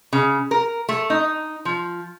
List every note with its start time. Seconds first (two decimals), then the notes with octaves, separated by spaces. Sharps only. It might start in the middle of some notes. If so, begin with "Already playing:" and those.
0.13 C#3
0.51 A#4
0.89 A3
1.10 D#4
1.65 F3